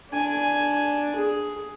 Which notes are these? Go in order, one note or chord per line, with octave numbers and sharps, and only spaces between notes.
D4 G#5
G#4